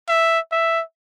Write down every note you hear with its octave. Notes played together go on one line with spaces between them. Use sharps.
E5
E5